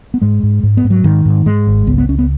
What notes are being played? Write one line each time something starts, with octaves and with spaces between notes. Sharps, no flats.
B3
G#2 G#3
G#2
G#2
B3
G#2
F#3
G#2 D#3
G#2
G#2 G#3
G#1
C#2 B3
B3
C#2 C#4
B3